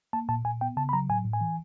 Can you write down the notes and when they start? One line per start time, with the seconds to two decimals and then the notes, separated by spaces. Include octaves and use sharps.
0.13 A#3 A5
0.29 A#2 A5
0.45 A#2 G#5
0.61 B3 G5
0.77 C#3 A5
0.89 B5
0.93 F#3 A#5
1.09 A2 G#5
1.25 A2
1.33 G#5
1.41 E3